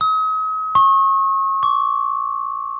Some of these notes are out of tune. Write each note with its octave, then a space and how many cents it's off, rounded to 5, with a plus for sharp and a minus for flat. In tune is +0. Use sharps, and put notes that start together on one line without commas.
D#6 +40
C#6 -35
D6 -45